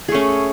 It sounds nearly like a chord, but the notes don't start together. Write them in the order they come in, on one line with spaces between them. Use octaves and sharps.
G#4 A3 C#4